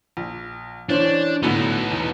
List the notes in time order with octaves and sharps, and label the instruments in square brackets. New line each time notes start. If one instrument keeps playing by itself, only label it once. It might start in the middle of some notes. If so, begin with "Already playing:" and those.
[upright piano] A#1
[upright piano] E3 C#4 C5 [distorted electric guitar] D4
[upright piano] A2 D3 F#3 [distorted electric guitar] B3 D#4
[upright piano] E2